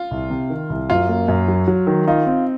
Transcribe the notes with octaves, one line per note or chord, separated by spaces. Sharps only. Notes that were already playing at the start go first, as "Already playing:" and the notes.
Already playing: F4
C2
C3
D#3
C2
F#2 F4
A#3
F#2
F#3
F#3
D#3
D#4 F4
C4